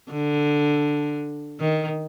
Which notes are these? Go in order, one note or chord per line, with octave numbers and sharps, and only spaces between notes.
D3
D#3